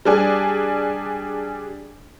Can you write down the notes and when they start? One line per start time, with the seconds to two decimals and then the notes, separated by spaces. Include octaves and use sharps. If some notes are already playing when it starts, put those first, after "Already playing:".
0.05 G3 D4 G#4